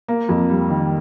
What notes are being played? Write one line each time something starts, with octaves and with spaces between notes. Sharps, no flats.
A#3
F2
G3
D#3